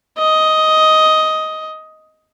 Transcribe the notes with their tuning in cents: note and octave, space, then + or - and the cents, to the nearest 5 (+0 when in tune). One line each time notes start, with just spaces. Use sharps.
D#5 +10